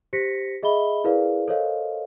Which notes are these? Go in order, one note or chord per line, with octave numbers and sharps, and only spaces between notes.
G4 C5 A#6 B6 C#7
G#4 D#5 E5 B5 G7
E4 G#4 A#4 B4 D5 F5
A4 A#4 C5 C#5 D#5 F5